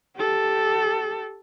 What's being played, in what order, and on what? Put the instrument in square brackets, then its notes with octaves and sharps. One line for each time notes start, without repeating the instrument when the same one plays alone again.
[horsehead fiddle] G4 A4